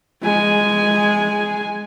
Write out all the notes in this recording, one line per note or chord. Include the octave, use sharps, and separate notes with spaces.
G#3 G#5